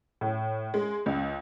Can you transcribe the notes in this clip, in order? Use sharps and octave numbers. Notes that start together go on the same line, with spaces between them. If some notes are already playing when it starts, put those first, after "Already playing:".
A2
G#3
C#2